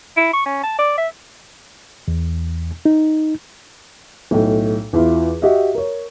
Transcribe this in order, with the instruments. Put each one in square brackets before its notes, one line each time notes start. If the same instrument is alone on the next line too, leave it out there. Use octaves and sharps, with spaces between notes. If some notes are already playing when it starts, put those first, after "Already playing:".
[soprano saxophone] E4
C#6
C#4
A5
D5
E5
[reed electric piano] E2
D#4
[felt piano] B1 A2
E2 E4 F4
F#4 G4 D#5 E5
A#4 C#5